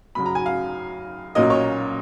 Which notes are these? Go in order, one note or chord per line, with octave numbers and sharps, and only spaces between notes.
F#2 C#3 F#3 B5
A#5
G#5
F5
B1 A#2 F#3 A#3 C#4 D#5
C#5